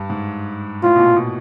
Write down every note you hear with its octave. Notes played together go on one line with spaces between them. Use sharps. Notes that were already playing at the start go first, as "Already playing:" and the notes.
Already playing: G2
G#2
A2 F4
B2
A#2
B2